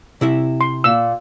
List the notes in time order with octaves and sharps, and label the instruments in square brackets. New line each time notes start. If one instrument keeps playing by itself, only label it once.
[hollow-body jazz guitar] C3 E4 E5
[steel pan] C6
[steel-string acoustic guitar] A#2 [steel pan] E6